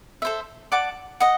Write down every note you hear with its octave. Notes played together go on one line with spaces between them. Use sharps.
A4 C5 E5
D5 F#5 A5 D6
D#5 F#5